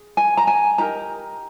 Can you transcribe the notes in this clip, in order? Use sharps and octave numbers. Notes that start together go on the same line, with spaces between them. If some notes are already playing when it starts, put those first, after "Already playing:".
Already playing: G#4
G#5
A#5
G#5
D#4 G4 A#4 A#5